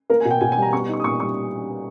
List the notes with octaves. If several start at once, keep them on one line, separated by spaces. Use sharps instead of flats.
A#3 A#4
G#5
B2
G5
B2 G#5
G#5
G3
A#5
B3 C#6
D#4 C#6
D#6
A#2 C#6
G3 C#6